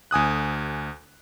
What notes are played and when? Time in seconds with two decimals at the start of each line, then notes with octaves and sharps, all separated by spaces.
0.11 D2 G#5 D#6 F#6